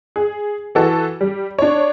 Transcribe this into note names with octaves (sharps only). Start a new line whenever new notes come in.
G#4
E3 F#4 A4
G3
D4 C#5